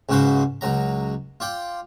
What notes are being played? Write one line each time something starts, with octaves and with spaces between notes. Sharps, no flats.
C#2 G#2 C#3 F#4 B4 C5
C#2 F#3 A#5
F4 D5 G5